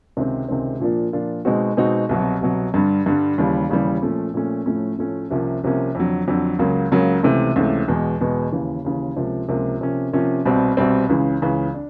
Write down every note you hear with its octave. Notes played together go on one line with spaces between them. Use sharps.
C#2 C3 D#3 G#3 C4
C#2 C3 D#3 G#3 C4
A#2 F3 A#3 D4 F4
A#2 F3 A#3 D4 F4
B2 G#3 C4 D#4 F#4
B2 G#3 C4 D#4 F#4
C2 B2 F#3
C2 B2 F#3
G2 D3 G3
G2 D3 G3
D#2 C#3 E3 G3
D#2 C#3 E3 G3
A#2 F3 A3 C#4
A#2 F3 A3 C#4
A2 F3 A3 C#4
A2 F3 A3 C#4
C2 C3 F3 A#3 C#4
C2 C3 F3 A#3 C#4
F2 D3 F#3
F2 D3 F#3
C#2 C#3 F#3 A#3
C#2 C#3 F#3 A#3
C#2 C3 E3 A3
C#2 C3 E3 A3
E2 B2 G#3 B3
E2 B2 G#3 B3
D#2 C#3 E3
D#2 C#3 E3
C#2 C3 F3 A#3
C#2 C3 F3 A#3
C3 F3 A#3 C#4
C3 F3 A#3 C#4
C2 B2 G3 C4
C2 B2 G3 C4
C#2 C#3 E3
C#2 C#3 E3
D4